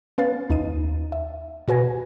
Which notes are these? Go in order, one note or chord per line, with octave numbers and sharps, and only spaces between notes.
B3 C#4 B4 F5 A6 C7
D#2 D#4 D#5 D#7
E5
B2 F#4 B4 G#5 G#6 A#6